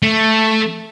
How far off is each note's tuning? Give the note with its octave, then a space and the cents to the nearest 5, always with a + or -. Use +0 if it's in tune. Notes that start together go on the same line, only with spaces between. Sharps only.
A3 +0